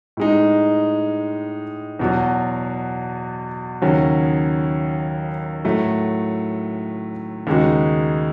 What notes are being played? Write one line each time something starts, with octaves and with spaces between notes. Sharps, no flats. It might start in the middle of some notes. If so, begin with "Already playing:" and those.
A2 G#3 D#4
E2 B2 F#3
D#2 C#3 F#3 C#4
A2 F#3 A3
D#2 C#3 G#3 D#4 F#4